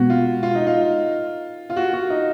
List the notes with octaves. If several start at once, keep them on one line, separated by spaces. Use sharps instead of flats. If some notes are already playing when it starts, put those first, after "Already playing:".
Already playing: B2 G#3 B3 F#4
F4
F4
D#4
F4
F4
F#4
F#4
D#4